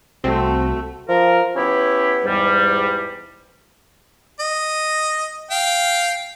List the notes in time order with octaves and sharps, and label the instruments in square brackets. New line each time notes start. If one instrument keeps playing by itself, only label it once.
[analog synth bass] C2 [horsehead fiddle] A3 [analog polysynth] C4 [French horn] F#4
[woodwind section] F3 A#4
B3 C#4 E4 G4
E2 G#2 G3
[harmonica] D#5
F5 G5